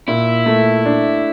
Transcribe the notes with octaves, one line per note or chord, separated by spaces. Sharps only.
A#2 E4
A3
D4